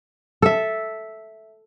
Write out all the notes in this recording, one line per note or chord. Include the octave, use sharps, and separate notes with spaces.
A4 E5